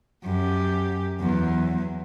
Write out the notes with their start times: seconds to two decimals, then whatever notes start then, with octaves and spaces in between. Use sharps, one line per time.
0.25 F#2 G4
1.21 E2 F#3